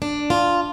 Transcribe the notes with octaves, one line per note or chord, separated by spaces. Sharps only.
D4
F4